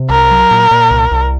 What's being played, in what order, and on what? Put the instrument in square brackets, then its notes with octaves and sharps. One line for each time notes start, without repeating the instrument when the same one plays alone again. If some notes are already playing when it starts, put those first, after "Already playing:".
Already playing: [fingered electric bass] C3
[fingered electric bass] C2 [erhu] A#4
[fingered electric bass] F#3
A#2
A#2
C2
C2